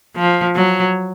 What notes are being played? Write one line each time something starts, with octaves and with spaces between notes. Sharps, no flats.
F3
F#3